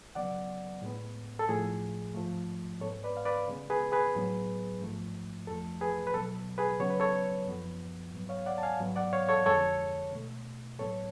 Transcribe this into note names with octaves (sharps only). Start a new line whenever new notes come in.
C#3 F#3 B3 D5 F#5
A2 G#3 B3
A4
A2 F3 A3 G#4
G#2 F3 A3
G#2 G#3 B3 A4 C#5
B4 D5
F5
B4 D5
C#3 G#3 B3
G#4 B4
G#4 B4
A2 F#3 B3
G#2 F3 A3
F2 F3 A3 A4
G#4 B4
B4
B2 F#3 B3 A4
G#4 B4
C#3 F#3 B3 C#5
B4
A4 C#5
F#2 F3 B3
G#2 F#3 B3
C#5 F5
D5 F#5
A5
F5 G#5
G#2 F#3 B3
D5 F#5
C#5 F5
A4 C#5
F2 D3 G#3 A4 C#5
B2 A3
A2 F#3 B3 A4 C#5